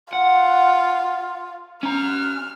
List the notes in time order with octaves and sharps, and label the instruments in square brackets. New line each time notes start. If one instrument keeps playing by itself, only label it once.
[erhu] F4 [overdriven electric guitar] F#5
[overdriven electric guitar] C#4 A#5 [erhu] F6